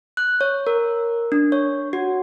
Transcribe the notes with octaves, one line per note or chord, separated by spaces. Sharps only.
F#6
C#5
A#4
D4
C#5
F#4